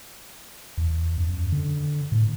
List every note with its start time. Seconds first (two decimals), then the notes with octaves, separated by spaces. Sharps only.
0.77 E2
1.17 F#2
1.52 D3
2.12 A2